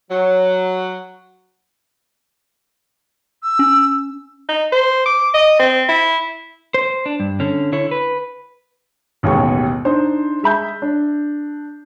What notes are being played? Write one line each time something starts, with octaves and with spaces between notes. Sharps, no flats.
F#3
E6
C#4
D#4
C5
D6
D#5
C4
E4
C5
D4
G2
D3 C#4
D3 E4 C#5
B4
A1 D#2 B2 G#3 C#6
D4 D#4 C5
G#3 E5 B5 G6
D4